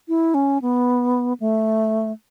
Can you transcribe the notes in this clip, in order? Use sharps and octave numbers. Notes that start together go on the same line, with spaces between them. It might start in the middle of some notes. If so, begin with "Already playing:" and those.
E4
C#4
B3
A3